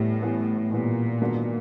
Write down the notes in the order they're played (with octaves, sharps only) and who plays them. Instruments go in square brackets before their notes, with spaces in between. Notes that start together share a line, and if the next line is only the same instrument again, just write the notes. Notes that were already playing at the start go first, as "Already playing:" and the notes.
Already playing: [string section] A2 [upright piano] E3 G3 B3
[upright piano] E3 G3 B3
[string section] A#2 [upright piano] E3 G3 B3
[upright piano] G#2 D#3 F#3 B3 D4